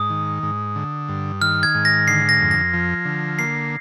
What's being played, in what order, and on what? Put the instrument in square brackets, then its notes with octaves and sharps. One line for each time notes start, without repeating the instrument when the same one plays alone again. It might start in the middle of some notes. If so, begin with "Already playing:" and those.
Already playing: [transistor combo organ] G#2 [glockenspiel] D#6
[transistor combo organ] D#3
G#2
D3
G2
[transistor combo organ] D#3 [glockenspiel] F6
[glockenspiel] G#6
[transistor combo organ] G#2
[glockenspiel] A#6
[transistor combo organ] D3 [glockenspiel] C7
[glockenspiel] A#6
[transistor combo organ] F2
[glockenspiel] A#6
[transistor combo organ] F3
D3
[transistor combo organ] A#3 [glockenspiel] C7